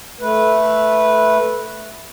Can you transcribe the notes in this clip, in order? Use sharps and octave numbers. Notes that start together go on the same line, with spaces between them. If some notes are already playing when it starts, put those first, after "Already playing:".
A3 B4